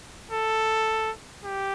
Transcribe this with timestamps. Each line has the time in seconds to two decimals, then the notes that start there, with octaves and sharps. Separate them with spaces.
0.31 A4
1.44 G4